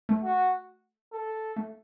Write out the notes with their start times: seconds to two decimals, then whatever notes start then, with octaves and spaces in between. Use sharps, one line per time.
0.09 A3
0.23 F#4
1.12 A4
1.56 A3